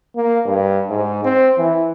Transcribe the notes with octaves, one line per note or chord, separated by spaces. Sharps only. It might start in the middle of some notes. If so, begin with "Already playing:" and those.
A#3
G2
G#2
C4
E3